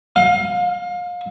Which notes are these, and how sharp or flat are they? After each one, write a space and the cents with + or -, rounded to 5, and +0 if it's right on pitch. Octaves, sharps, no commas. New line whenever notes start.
F5 +30